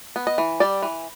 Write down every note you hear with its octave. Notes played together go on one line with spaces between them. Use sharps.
B3
D#5
E3
G3 D5
E3